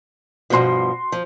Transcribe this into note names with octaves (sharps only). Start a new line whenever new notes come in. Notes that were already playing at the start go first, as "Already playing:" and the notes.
G2 B2 F3 F#4 C6
F3